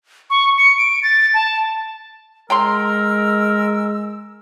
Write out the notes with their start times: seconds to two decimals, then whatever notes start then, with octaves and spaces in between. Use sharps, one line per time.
0.30 C#6
0.58 C#7
0.78 D7
1.03 A6
1.34 A5
2.50 G#3 A#4 G5 A#5 C6 E6